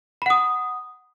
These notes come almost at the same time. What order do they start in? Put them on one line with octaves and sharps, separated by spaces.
B5 F#5 D#6